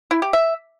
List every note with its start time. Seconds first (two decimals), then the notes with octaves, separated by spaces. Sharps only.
0.11 E4
0.22 G4
0.33 E5